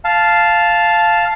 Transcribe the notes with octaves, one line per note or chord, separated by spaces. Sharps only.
F5 A5